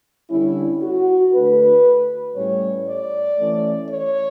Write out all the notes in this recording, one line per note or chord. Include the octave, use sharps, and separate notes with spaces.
D3 G3 C#4 E4
F#4
D3 A3 D4 B4
A2 G3 C#4 C#5
D5
E3 A3 C#4
C#5